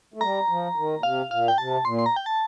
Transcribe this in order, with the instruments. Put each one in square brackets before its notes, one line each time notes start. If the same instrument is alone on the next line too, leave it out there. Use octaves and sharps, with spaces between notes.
[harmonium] A3
[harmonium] G3 [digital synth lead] A#5
[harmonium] F3
D#3
A#2
[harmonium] C3 [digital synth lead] F5
[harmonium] A#2 [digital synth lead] F5
[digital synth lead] G5
[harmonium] C3 [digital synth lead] A5
[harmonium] A#2 [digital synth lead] C6
[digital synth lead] C6
A#5
G5
A5